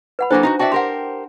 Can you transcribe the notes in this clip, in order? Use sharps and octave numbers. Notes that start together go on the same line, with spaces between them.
B4 F#5 B5
F#3 A#3 D4 E4 A4 C5
D#4 F4 F#4
F#4 D5 E5 G5 A5
G4 A#4 C5 F#5 C6